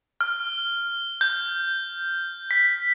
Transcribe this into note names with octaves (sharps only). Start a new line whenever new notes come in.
F6
G6
B6